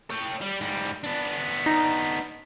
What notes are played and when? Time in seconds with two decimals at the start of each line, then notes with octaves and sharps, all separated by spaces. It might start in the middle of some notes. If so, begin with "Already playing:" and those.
0.10 C#5 G5
0.42 G3
0.61 G#2 G3
1.04 B3 D4
1.66 D#4